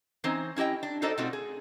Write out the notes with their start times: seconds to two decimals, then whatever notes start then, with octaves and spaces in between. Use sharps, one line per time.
0.24 E3 C4 C#4 D#4 C5
0.56 C#4 E4 G4 D#5 G5
0.83 D4
1.02 D#4 F#4 A4 C5 D5 D#5
1.18 B2 A3 C4 D#4 F4 F#4
1.33 G#4